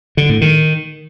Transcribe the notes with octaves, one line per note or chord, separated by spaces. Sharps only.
D3
A2
D#3